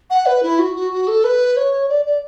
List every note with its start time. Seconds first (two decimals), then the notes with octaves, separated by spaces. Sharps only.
0.10 F#5
0.26 B4
0.43 E4
0.59 F#4
0.76 F#4
0.92 F#4
1.07 A4
1.24 B4
1.56 C#5
1.89 D5
2.05 D5